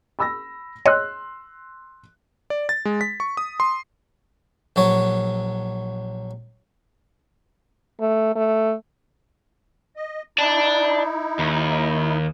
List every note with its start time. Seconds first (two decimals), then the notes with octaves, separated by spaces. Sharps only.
0.19 B5 E6 A#6
0.86 C#5 D#5 C6 E6 F#6
2.50 D5
2.69 A6
2.85 G#3
3.01 B6
3.20 C#6
3.37 D#6
3.60 C6
4.76 A#1 F#3 C#5
8.00 A3
8.36 A3
9.96 D#5
10.38 D#4 E4 D5 A5
11.39 D#2